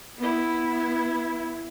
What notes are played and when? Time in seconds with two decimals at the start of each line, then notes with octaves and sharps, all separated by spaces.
0.18 B3 E4